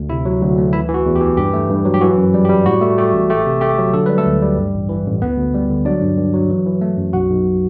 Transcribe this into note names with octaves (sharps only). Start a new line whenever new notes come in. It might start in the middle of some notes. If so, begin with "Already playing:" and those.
Already playing: D2
C3 E4 E5
F#3
D2
A3
E3 E4 E5
E3
F#4
E2
G4
E3
G2 G4
A3
G2
F#3
G4
E3 F#4
F#2
G3
G4
G3
A2 F#4
A3
A3 G4
A1
A3 G4
C3
A3 G4
F#3
D3 A4
G3 B4
A3 A4
D2
G3
G2
A1
E3
A1
D2 B3 B4
D2
G3
D3
F#3 D4 D5
G2
G2
F#3
E3
E3
A3
F#2
B1 F#4 F#5
B1